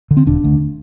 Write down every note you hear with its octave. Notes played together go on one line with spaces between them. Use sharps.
D3
C4
E1 D4
D2 D3